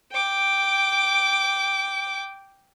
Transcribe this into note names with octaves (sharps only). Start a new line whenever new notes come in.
G5 D6